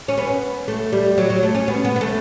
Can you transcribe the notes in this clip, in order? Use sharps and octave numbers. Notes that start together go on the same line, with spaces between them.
C#4
B3
A3
G3
F#3
F#3
A3
C#4
B3
B3
B3
A3